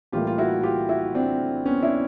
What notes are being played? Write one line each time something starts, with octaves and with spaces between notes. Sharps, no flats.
A2 E3 G3 A#3 F4 G4
F4
E4 F#4
F4 G4
E4 F#4
C4 D4
B3 C#4
D4 E4